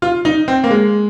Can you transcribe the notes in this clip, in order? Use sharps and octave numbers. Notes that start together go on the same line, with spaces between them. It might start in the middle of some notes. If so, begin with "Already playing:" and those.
F4
D#4
C4
A#3
G#3